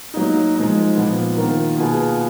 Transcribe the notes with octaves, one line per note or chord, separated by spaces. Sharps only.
F#3 A#3 D#4
F3 G#3 D#4
A#2 F3 B3
D#3 A#3 F4 A#4
B2 A#3 F4 G#4 B4